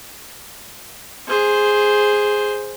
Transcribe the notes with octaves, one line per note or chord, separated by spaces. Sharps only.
G#4 C5